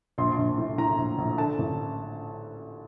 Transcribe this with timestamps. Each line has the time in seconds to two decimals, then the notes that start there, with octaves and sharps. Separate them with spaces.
0.18 A#1 C6
0.38 A#1
0.57 A2
0.78 A2 A#5
0.98 A#1
1.18 A#1
1.38 D3 A5
1.58 A1